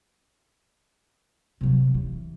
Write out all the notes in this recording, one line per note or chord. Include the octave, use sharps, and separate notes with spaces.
C3 F#3
E3